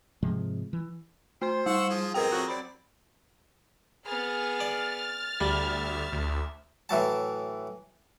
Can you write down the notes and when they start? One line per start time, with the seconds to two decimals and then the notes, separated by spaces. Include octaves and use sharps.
0.23 G#2 C3 F3 G#3
0.73 E3
1.42 A3 C5 C6
1.66 G3 F#5 C#6 E6
1.89 F3 F4 G#4
2.14 F2 G#2 B2 C4 G#4 A#4 G5 A#5
2.31 F2 A2 F#4
2.48 F#3 C4 D5 B5
4.07 B3 G#4 F6 A6
4.60 D5
5.41 D2 G3 E5
6.12 D2
6.89 A2 E3 F#3 A5